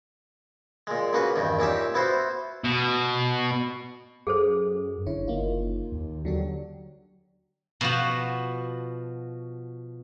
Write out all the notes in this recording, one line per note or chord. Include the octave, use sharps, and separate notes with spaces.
A#2 G#3
C#3 A#3 F#4 B4
E2 G2 D#3
A#2 C#4 D#4 G4 E5
B3 E4 F#4 C5
B2
F#2 G#4 A4 C5
G1 D3 E4 C#5
F#1 A#3 D#4 F4
D#2
D3 F#3 D4 G4
B2 F3 F#4